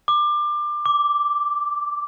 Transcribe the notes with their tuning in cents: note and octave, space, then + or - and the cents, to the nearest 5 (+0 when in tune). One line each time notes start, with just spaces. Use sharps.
D6 +25
D6 -5